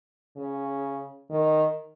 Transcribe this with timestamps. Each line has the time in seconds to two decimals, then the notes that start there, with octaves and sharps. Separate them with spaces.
0.37 C#3
1.30 D#3